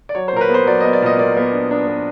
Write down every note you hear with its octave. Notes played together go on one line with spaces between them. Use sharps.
D5
F#3 C#5
C5
A#2 A#4
B4
B3 C5
F#3 D5
D#5
B3
D5
A#2 D#5
A#2 D5
B3
D4
D4
B3